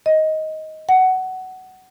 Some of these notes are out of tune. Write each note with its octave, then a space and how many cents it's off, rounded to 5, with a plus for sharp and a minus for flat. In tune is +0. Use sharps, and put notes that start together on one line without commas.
D#5 +10
F#5 +15